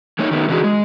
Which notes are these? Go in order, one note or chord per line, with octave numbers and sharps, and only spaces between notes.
A3 A#3 D#4 C#5
D#3 A3 B3
D3 E3 C#4 E4 F#4 G#4
G#3